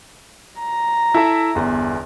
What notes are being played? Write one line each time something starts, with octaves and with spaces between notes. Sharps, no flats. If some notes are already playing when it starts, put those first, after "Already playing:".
A#5
E4 A4 E5
G1 E2